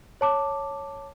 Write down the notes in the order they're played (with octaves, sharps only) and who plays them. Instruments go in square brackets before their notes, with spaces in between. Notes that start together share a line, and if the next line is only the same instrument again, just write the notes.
[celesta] C#5 A5 D6